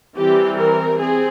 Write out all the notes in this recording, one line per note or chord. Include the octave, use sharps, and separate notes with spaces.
E3 G3 C4 G4
A#4
C4 G#4